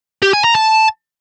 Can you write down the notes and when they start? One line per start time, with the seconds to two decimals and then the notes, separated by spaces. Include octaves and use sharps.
0.22 G4
0.33 G#5
0.44 A#5
0.55 A5